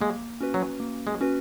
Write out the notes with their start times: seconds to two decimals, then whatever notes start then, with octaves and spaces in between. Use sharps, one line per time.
0.01 G#3 A#3
0.41 C#4 F#4 B4
0.54 F#3
0.80 A#3
1.07 G#3
1.21 C#4 F#4 B4